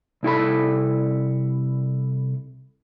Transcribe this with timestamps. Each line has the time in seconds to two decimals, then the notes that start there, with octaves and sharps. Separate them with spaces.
0.23 C2 E4 A4 B5